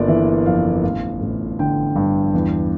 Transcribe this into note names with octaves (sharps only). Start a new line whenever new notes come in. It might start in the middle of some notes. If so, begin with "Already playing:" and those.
Already playing: G1 A#3 F4 D5
E3 E5
F2 F5
A1 F5
A1
D3 G5
G2
E2